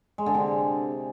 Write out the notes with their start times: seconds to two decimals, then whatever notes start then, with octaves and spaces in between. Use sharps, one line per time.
0.18 G#3
0.26 D3
0.34 C3